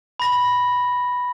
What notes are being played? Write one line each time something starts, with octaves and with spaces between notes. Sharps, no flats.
B5 A#6